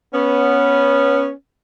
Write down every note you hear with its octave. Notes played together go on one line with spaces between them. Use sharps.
B3 C#4